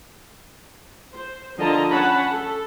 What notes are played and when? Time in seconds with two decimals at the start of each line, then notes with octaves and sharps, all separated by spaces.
1.14 C5
1.58 D3 F3 A#4 D#5 A5 A#5
1.91 C#4 C#5 F#5 A5 B5
2.32 A4